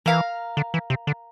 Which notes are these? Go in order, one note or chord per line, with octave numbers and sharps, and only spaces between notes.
E3 A#4 F5 A#5
D3
E3
C3
D3